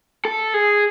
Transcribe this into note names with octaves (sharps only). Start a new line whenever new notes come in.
A4
G#4